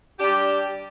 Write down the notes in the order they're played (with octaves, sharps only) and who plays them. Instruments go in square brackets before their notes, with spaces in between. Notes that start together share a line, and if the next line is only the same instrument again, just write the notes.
[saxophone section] G3 D4 G4